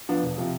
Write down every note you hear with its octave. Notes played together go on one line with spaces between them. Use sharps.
F3 B3 D4
E1
C3 F3